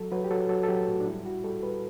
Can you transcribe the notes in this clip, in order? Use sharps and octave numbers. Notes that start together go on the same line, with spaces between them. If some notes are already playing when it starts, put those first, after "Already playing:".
Already playing: F#3 A4
F#3 B4
G4
F#3 A4
F#3 A4
A4
F#3 G4
A2 F#4
D4
G3 E4
G3 F#4
G3 A4
G3 B4